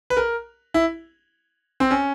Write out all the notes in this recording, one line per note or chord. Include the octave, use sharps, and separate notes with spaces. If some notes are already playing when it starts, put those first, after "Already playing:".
B4
A#4
E4
C4
C#4